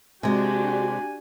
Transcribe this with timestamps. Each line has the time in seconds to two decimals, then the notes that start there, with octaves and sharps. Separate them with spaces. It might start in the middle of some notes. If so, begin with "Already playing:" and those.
0.23 C3 G#3 D4 F#4 G4 G#5